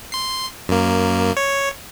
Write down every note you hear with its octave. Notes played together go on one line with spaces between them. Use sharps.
C6 C7
F#2 A#3
C#5